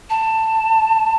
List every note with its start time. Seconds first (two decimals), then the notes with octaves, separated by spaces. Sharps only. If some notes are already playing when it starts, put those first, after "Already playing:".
0.10 A5